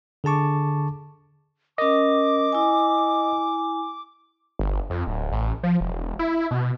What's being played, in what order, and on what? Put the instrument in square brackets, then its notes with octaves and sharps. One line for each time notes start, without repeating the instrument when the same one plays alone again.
[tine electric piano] D3 G#4 A5 C#6 D6
[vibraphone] C#4 A#4 [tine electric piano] D#5 [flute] D6
[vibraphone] E4 G#5
[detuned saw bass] G1
F2
D1
A1
F3
E1
E4
B2